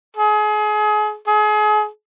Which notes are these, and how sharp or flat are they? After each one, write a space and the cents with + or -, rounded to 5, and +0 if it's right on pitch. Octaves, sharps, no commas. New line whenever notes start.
G#4 +30
G#4 +35